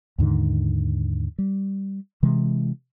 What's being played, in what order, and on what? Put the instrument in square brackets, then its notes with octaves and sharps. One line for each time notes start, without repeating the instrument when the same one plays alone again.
[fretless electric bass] D#2 G#2 D3 D#3
G3
C3 E3 G#3